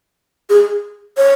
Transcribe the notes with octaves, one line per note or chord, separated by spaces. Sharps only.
G#4
C#5